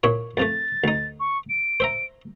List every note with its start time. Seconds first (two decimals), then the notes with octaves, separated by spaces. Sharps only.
0.03 A#2 E4 C#5
0.37 F2 F3 A3 A6
0.84 D2 D#4
1.20 C#6
1.50 D7
1.80 C5 E5 A#5